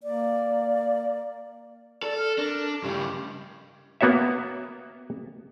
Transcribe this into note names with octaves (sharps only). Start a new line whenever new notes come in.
A#3 D5
A4 D5
F6
D4 A#4
G2 C#3 G4
A#3 B3 F#4 C#5 E5